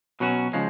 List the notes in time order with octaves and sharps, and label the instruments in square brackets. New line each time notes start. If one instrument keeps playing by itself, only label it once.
[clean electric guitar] B2 F#3 C#4 F#4
C#3 F3 G#3